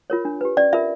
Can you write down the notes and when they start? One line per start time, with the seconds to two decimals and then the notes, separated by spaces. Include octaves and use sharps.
0.10 F4 A#4 C#5
0.25 D4
0.41 G4 B4
0.57 C#4 D5
0.73 F4 A#4 E5